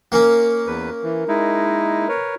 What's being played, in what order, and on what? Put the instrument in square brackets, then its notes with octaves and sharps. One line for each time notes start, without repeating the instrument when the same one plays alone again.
[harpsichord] A#3 C#4
[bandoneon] E2 B4
E3
G#3 D#4 E4
A#4 B4 C#5